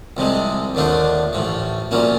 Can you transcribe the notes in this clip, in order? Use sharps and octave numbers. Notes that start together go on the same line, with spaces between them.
C2 C3 F3 G#3
D#2 D3 F3 A3 D4
A1 A2 F3
B1 A#2 F3 A#3 C#4